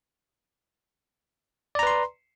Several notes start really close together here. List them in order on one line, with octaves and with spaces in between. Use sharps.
D5 A#5 B4 C6